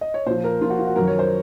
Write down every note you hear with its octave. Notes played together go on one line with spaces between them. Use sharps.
D#5
C#5
A#2 F3 C5
A#4
A#2 F3 F4
F#4
F4
F#4
F#2 D#3 F#3 A#4
C#5
C5